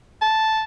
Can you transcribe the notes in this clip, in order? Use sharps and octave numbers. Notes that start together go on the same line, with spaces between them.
A5